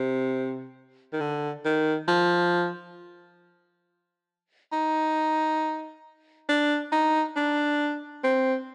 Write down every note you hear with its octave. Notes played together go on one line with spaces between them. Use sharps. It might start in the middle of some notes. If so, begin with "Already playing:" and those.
Already playing: C3
D#3
D3
D#3
F3
D#4
D4
D#4
D4
C4